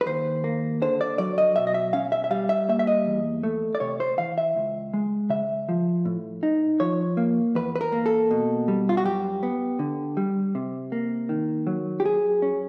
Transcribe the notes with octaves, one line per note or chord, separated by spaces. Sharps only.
B4
D#2 C5
A#3
D3 C5
D5
F#3 D5
D#5
B2 E5
D#5
E5
C#4 F5
E5
E5
G3 F5
E5
A#3 E5
E5
D#5
E2
A3
D5
C3 C#5
C5
E3 F5
E5
C#2
G#3
C#3 E5
F3
A2
D#4
F3 C#5
A#3
E2 B4
B4
A#4
A#3
A4
B2
G3
F4
F#4
F#2 G4
B3
D3
G3
C3
A#3
D#3
F#3
G4
F#2 G#4
C#4